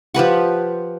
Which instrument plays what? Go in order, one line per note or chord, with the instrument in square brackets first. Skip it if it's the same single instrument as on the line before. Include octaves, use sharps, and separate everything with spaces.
[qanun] F3 G4 B4 F#5